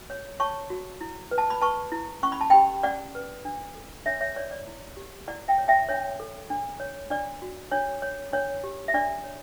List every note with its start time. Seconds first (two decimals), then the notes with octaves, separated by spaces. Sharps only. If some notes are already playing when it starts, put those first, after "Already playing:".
Already playing: F#4
0.10 C#5
0.40 C#5 A5 C#6
0.70 F#4
1.01 E4
1.31 B4
1.38 A5
1.50 B5
1.61 B4 A5 C#6
1.92 E4
2.23 C#4 C#6
2.32 B5
2.41 A5
2.50 G4 G5 B5
2.83 C#4 D5 F#5
3.15 B4
3.45 D4
3.75 A4
4.06 D4 C#5 E5
4.21 C#5 E5
4.36 C#5 D5
4.51 D5
4.67 E4
4.97 G4
5.28 E4 D5 F#5
5.48 E5 G5
5.58 C#5
5.68 E5 G5
5.89 D4 C#5 E5
6.20 A4
6.50 D4
6.80 C#5
7.10 D4 D5
7.42 F#4
7.72 D4 C#5
8.02 C#5
8.33 D4 C#5
8.64 G4
8.88 E5
8.94 D4 D5
9.24 C#5